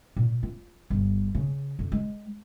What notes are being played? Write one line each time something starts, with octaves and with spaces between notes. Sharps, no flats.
A#2
F4
G1
C#3
F2
G#3